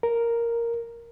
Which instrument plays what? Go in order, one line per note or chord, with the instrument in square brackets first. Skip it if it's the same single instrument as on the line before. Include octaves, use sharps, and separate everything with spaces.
[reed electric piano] A#4